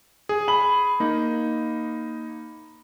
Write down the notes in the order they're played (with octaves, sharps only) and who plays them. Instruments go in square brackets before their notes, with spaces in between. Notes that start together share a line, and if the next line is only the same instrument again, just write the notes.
[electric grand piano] G#4
[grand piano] B5 F#7
[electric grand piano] A#3 D#4